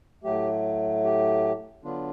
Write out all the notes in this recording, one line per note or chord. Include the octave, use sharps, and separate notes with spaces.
A2 F#3 A3 G4
G4
D3 F#3 B3 D4 F4